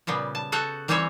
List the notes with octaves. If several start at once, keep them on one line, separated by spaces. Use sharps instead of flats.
A#2 C#3 G3 B3
A5
F#4 A4 F#5 G5
E3 G3 C4 C#4 C#5 E5